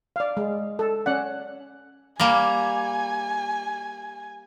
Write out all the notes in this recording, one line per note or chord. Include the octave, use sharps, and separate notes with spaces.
D5 F5
G#3
A4
C#4 D5 F#5
G3 A#3 G#5